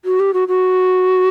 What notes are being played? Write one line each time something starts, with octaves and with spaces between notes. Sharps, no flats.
F#4
G4
F#4
F#4